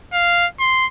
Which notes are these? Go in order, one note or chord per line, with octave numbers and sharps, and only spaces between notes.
F5
C6